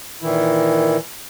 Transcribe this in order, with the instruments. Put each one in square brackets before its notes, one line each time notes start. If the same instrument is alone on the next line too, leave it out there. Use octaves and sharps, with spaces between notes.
[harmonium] A#2 D#3 E3 E4